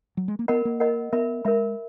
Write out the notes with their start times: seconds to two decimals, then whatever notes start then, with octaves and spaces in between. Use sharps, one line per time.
0.17 F#3
0.28 G#3
0.39 A#3
0.48 B3 A#4 D#5 F#5 B5
0.65 A#3
0.80 A#4 D#5 F#5 B5
1.13 B3 A#4 E5 B5
1.45 G#3 A#4 E5 B5